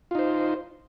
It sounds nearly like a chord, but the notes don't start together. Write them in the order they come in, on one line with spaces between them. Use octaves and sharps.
F4 D#4 C5